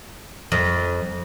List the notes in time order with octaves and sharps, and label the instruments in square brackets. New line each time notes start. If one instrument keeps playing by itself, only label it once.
[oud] F2